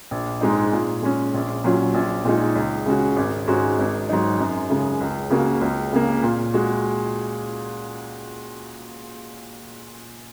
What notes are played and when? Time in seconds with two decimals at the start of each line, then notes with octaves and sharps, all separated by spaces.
0.11 A#1
0.41 G#2 G#3 D#4
0.72 A#2
1.02 G#3 C#4
1.34 A#1
1.64 A#2 F#3 C#4
1.94 A#1
2.25 A#2 G#3 D#4
2.55 C#2
2.86 C#3 G#3 C#4 F#4
3.16 G#1
3.48 G#2 G#3 C#4 F#4
3.78 G#1
4.09 G#2 F#3 D#4
4.39 F#2
4.70 C#3 G#3
5.00 C#2
5.30 C#3 A#3 F#4
5.61 C#2
5.93 C#3 A#3
6.23 A#2
6.54 G#3 F#4